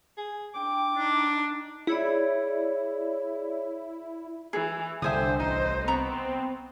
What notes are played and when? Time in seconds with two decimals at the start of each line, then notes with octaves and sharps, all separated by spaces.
0.17 G#4
0.54 D4 G5 D6
0.97 D4 D#4
1.87 E4 G#4 C#5 D5
4.53 E3 G#4
5.02 C2 D3 C5 E5 G5 G#5 D#6
5.40 A1 D#4 C5 D#5
5.88 B3 C4 A#5 B5 C#6